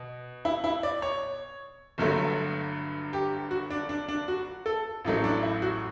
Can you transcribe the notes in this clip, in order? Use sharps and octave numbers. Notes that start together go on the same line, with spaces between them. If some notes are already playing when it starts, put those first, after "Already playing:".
Already playing: B2
E4
E4
D5
C#5
G1 G2 D3 F#3 A3
G4
F#4
D4
D4
D4
F#4
A4
A1 A2 F#3 A3
D4
E4
F#4